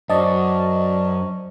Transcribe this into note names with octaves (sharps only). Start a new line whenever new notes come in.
F#2 C5 D5 D#5 A5 C#6